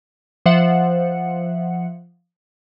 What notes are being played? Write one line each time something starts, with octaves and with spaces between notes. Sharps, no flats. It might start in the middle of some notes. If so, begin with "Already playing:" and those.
F3 C5 E5 F#5 C#7